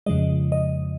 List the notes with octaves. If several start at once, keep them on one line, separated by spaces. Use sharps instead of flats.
F2 C#3 F3 G#3 D#5
D#5